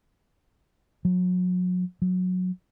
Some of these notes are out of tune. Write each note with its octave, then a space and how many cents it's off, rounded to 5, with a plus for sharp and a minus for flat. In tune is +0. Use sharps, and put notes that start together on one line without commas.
F#3 -35
F#3 -15